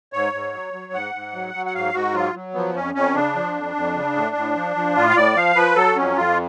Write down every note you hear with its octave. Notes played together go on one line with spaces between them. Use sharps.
G#2 C#5
G#2
F#3
F#3
G#2 F#5
G#2
F#3
F#3
F#5
G#2 F5
G#2 F#4
F#3 F4
F#3
F3 B3
F2 C#4
F2 C#4
C#3 D4
F3
F2
F2
C#3
A2
A2
F3
F3
A2 F4
F5
A2 D5
F3 F5
F3 B4
F#3 A4
F2 C#4
F2 F4